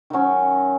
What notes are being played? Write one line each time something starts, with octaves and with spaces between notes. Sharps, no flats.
D#3 F#3 C#4